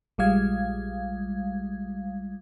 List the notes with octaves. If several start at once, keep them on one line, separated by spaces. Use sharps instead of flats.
A#1 G3 G#3 F5 G#6